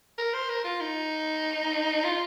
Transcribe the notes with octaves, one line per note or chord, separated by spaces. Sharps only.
A#4
C5
A#4
F4
D#4
F4